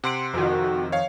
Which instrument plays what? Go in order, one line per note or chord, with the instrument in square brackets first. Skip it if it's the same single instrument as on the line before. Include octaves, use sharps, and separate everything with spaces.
[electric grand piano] C3 C6 D7 [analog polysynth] F#5
[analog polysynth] F2 D#3 [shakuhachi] F#4
[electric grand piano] C#5 F5